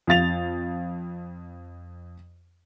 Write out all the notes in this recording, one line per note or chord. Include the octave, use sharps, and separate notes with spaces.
F2 F5 A6 F7